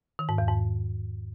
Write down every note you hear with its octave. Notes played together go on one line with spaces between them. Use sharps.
D#3
G#2
E2
G#2